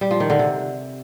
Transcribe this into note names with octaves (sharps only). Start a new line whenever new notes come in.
G3
F3
D#3
D3
C3